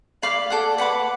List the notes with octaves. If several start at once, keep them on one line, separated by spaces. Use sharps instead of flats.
D5 F5 B5 D6
A4 D5 F#5
B4 F#5 B5 D6